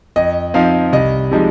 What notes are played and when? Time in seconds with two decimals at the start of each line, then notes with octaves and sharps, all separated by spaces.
0.16 F2 D#5
0.54 F3 C4 D#4 F5
0.92 C2 D#5
1.31 C3 F3 G#3 D#4